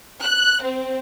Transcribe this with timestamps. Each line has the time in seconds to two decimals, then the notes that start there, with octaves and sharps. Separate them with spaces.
0.22 F#6
0.63 C4